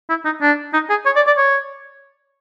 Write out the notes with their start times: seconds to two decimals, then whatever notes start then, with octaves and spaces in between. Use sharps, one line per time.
0.09 E4
0.25 D#4
0.42 D4
0.73 D#4
0.90 G#4
1.06 C#5
1.16 D5
1.27 D5
1.37 C#5